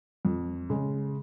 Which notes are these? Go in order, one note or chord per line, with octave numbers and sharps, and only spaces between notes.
F2
C#3 G#3